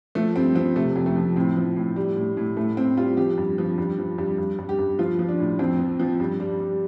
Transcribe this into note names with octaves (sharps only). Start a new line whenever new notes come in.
F3 A3
G2 C4
F3 C4
C3 A3
F2
A3
F3
A2 C4
F3
A2
G3
A2
A2
A2 A3
A2 C4
G3 F4
F3 G4
G2
F3
G2
F3
G2
G2
G2
G4
G2
F3 F4
F3
D4
A2
F2 C4
F3
F3
G2
G3
G3